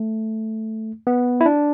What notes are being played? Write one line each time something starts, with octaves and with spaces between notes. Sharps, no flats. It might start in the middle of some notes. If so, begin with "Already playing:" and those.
Already playing: A3
B3
E4
D4